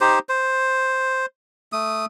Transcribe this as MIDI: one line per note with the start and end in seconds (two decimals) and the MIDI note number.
0.01 0.19 63
0.01 0.19 67
0.01 0.19 72
0.29 1.26 72
1.73 2.06 57
1.73 2.06 87